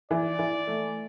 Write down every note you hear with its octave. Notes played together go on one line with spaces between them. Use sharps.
E3 D5
E3
A3